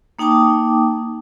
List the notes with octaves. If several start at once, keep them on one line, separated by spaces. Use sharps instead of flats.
A#3 D#4 G5 A5 D6 D#6